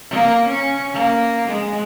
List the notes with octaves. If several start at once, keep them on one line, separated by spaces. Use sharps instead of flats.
A#3
C#4
A#3
G#3